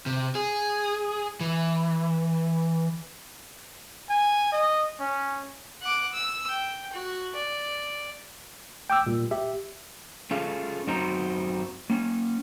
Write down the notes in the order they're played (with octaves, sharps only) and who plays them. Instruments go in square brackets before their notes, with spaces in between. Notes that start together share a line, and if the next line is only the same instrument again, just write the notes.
[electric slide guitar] C3
G#4
E3
[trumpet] G#5
D#5
C#4
[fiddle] F#5 D6
E6
G5
F#4
D5
[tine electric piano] G5 D6 E6
A#2 G3
G4 E5
[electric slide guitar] C#4 F4 G#4 A4 F5
F#2 C4 D#4 F#4 C5 A#5
A#3 C#4